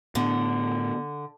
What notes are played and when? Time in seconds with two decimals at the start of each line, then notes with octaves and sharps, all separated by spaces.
0.15 A2 D3 B3